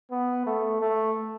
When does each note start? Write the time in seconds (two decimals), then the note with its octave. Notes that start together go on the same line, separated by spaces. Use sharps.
0.11 B3
0.47 A3
0.81 A3